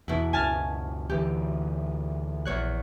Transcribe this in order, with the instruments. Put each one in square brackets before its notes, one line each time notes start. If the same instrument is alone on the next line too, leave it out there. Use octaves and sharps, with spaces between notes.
[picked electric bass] E2 [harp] B2 E4
[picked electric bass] C#2 F#2 [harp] G#5 A5 F6
[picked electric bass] D2 E3 [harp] G4
[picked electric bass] A#1 [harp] E2 C#5 F#6